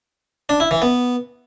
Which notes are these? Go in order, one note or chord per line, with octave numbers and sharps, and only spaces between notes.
D4
E4
E3
B3